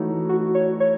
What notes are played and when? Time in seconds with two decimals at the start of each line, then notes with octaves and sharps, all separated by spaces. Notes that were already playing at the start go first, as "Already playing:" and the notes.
Already playing: E3 A3 D#4 F#4 C#5
0.29 F#4
0.55 C#5
0.80 C#5